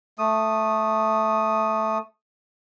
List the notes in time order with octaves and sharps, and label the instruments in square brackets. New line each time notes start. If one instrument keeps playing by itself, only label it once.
[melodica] A3 D#6